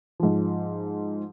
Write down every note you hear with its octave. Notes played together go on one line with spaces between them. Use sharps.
G#2 F3